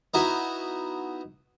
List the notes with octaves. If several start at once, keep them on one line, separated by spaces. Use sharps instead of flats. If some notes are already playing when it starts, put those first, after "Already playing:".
B3 D#4 E4 F#4 B4